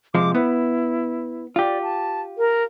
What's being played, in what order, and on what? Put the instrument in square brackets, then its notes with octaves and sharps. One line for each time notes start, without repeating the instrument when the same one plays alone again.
[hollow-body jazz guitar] C3 F3 G#3 [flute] D6
[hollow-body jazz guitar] B3 [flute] E4
[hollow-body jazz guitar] F4 G4 [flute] D5
[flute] A5
A#4